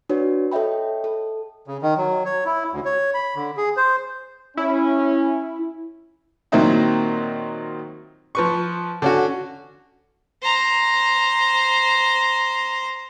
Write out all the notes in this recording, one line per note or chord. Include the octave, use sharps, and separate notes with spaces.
D4 F#4 B4 C#5
A4 C#5 D#5 E5 G5 B5
A4
C#3
D#3
F#3
C#5
E4
D2
C#5
B5
D3
G#4
C5
C#4 E4
A#2 D#3 F#3 C4 D#4 E4
F3 B4 C#6
D3 C#4 F#4
C5 A#5